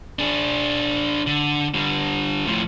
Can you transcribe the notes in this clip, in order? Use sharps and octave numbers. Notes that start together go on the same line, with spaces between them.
D4 G#4
D3
D3 G3
A2 F3